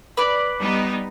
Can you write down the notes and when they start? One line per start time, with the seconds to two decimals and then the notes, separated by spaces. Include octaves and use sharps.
0.17 B4 D5
0.59 G3 B3 D#4